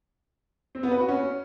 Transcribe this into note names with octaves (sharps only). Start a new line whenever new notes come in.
C4
B3
B4
F#4
C#4